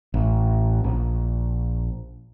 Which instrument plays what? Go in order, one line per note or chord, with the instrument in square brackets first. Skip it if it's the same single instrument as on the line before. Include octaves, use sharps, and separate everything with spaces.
[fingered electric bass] A1
A#1